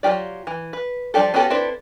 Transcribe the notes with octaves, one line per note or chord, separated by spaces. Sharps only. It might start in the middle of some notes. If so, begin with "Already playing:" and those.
F#3 A#3 F4 G4 D5
E3
B4
F3 G3 D4 G4 A4
B3 C#4 F#4 G4 A4
C4 D4 E4 A4 B4